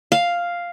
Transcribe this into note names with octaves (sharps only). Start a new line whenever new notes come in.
F5